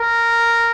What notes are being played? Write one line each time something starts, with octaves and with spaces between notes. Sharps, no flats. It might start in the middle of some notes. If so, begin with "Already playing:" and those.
Already playing: A#4